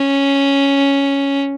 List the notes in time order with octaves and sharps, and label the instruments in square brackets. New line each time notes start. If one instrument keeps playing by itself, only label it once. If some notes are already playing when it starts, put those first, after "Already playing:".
Already playing: [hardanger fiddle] C#4